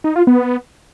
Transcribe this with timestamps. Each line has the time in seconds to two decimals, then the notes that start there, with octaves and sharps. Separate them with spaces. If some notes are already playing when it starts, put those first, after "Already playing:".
0.04 D#4
0.16 F4
0.27 B3